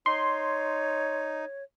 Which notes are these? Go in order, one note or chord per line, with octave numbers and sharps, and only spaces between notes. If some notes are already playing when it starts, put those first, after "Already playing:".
D#4 C#5 C6